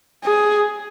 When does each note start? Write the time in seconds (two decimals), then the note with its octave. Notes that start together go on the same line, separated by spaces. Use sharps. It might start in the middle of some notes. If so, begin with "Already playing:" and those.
0.24 G#4